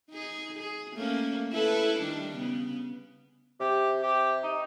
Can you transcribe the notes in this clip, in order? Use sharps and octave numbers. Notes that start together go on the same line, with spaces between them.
D#4 G#4
G#4
A3 A#3 C#4
E4 A4 B4
D#3 G3 D4
C#3 B3
C3 G4
G4
D#4